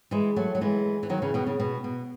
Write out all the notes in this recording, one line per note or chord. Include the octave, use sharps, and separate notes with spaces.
E3 G#3
F#3 A3
F#3
E3 G#3
E3
D#3 F#3
C#3 E3
B2 D#3
C#3
B2
B2